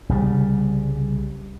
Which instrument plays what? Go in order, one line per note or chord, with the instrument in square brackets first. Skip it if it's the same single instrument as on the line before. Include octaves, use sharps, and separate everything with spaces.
[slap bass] C2 C#3 G3